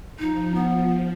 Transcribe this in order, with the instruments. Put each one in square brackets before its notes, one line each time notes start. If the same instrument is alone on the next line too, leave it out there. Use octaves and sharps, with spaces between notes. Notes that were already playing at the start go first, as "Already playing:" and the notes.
[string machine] F3 [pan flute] D#4
[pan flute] B3